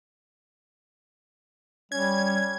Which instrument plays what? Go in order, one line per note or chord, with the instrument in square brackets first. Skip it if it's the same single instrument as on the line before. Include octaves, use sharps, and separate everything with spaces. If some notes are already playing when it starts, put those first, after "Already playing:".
[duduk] G3 [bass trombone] C#4 [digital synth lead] G#6